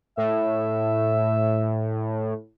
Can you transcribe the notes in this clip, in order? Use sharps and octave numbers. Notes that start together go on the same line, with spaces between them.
A2 E5